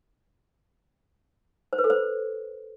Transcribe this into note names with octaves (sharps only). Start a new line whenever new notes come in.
C5
B4
A4
C5